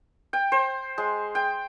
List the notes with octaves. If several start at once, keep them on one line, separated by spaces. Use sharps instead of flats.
G5
C5
G#3
G5